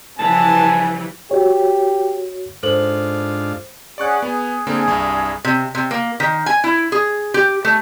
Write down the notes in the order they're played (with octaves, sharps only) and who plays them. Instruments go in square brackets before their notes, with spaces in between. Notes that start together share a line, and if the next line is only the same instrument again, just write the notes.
[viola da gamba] C#3 F3 G3 [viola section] E3 [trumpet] G#5 [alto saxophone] A5
[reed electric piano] F#4 C#5 [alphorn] G4
[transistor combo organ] G#2 D4 F4 [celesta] A4 C5 F#7
[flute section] C#4 G#4 F#5 [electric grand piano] D5 C#6 F#6
[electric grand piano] B3 [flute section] G#4
[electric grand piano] D3 A#3 C4 [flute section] G#4
[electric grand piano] C2 G2 G#6
[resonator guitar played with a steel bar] C3
C3
A#3
D#3
G#5
E4
G#4
G4
A3